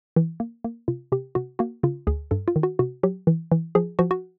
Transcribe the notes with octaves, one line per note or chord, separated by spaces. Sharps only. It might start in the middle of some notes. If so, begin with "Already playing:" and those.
E3
A#3
A#3
C3 F4
C3 G4
C3 F#4
A#3 F#4
C#3 F4
D2 G#4
G2 A4
F4
D#3
F#4
C3 F#4
F#3 G4
E3
E3
F3 G#4
F3 F#4
F#4